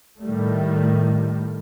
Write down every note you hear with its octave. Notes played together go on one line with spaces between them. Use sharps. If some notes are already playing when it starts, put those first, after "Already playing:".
A2 D#3 G3 A3